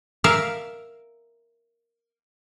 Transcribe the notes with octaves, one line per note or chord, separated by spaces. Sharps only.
A#4 E5 F5